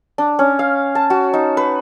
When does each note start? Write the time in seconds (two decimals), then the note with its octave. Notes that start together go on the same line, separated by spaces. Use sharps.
0.18 D4
0.39 C#4
0.59 F5
0.95 A5
1.10 F#4
1.34 D#4
1.57 B4